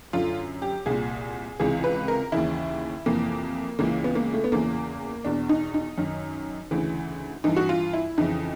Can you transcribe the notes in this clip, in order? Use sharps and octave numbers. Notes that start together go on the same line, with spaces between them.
F#2 D3 F4
G4
C2 A#2 G#4
C#2 C3 E3 G#4
B4
A#4
D#2 C#3 E3 E4
F2 C3 E3 A#3
C#2 C#3 E3 A#3
B3
A#3
A3
B3
E2 C#3 E3 A#3
E2 B2 D4
D#4
D#4
F#2 D#3
D2 C#3 E3
G2 E3 D#4
F#4
F4
E4
F2 C#3 E3 D#4